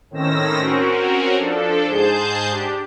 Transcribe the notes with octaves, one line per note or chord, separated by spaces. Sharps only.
A2 D#3 C4 C#4 E6 A#6
C4 C#4 F#4 A#4
F3 D4 A4
G#2 G#4 C5 A5 G6
D4 G4